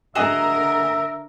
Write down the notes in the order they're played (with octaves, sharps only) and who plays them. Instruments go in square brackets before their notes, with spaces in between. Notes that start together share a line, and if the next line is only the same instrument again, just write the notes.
[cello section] D3 A#4 [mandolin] F#4 G#4 D#5 [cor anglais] E5